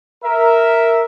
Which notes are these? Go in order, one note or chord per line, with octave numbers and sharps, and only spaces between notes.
A#4 E5